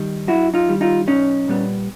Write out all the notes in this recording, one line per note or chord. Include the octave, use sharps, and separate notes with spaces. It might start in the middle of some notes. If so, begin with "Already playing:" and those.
Already playing: D#3 G3
F#2 E4 F#4
D#4 F4
D#3 G3
D#4 F4
B1 C#4 D#4
A#2 G3 B3